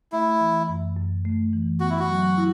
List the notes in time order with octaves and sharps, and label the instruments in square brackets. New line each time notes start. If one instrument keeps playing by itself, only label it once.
[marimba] A3 [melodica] E4
[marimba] E3
F#2
F#2
A3
E3
[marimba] B3 [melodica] F#4
[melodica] E4
F#4
[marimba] F#3
E4